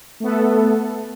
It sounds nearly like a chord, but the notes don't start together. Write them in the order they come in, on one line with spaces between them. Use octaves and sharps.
A3 B3 A4